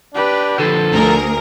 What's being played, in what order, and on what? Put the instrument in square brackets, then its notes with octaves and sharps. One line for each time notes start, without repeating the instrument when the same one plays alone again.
[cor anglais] D4 [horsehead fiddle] G4 B4
[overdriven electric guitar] D3 F3 [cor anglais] A4
[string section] D2 A#4 [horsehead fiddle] G#4